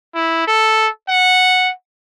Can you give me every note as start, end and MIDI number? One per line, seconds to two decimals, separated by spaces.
0.15 0.44 64
0.47 0.88 69
1.09 1.71 78